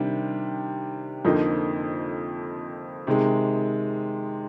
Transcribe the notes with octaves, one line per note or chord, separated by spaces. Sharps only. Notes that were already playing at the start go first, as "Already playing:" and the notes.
Already playing: C3 D#3 G3 D4
F2 D3 F3 A#3 D#4
C3 D#3 G#3